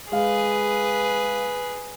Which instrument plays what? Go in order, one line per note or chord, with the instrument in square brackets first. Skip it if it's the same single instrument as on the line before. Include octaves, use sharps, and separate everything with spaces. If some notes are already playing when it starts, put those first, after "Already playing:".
[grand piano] G#3 F5 [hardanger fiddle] G#4 B4